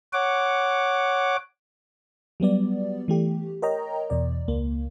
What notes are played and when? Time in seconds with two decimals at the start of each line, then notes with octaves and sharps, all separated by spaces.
0.13 C#5 F#5 D6
2.40 F#3 G3 B3 D5
3.08 E3 A3 G4
3.62 A#4 C#5 D#5 G5 A#5
4.10 E2 B2 D5
4.48 C#2 A#3